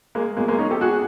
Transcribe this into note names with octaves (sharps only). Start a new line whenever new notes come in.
G#3 A#3
B2 F#3 G#3 A#3
G#3 A#3
C#4 D#4
G4 A4
F#4 G#4